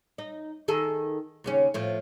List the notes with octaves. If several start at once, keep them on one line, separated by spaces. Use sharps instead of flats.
D#4
D#3 G#4 A4
D#2 C#3 C#4
A2 F3